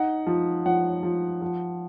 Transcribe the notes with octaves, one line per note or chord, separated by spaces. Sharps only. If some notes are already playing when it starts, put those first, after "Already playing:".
Already playing: D#4 F#5
F3
F3 F#5
F3
F3